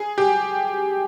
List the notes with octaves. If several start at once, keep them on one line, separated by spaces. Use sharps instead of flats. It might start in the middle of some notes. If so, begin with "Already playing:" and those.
Already playing: G#4
G4